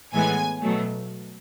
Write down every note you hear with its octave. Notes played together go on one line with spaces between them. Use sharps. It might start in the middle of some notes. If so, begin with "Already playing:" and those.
A2 E3 G#3 B3 G#5
B2 F#3 A3